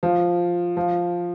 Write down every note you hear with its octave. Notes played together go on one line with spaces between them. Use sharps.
F3
F3